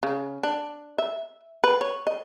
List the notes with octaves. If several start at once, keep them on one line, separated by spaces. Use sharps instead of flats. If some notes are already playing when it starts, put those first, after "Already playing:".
C#3
D4
E5
B4
C#5
D#5